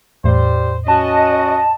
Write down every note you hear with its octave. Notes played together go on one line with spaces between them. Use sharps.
E2 A2 G3 C5
C#4 F#4 D#5 A5